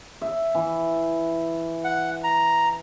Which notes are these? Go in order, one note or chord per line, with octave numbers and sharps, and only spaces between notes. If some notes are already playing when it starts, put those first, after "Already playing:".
E5
E3
F#5
A#5